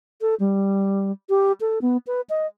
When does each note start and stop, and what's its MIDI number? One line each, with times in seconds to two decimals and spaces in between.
0.21 0.35 69
0.40 1.12 55
1.29 1.52 67
1.61 1.79 69
1.82 1.97 59
2.07 2.21 71
2.30 2.47 75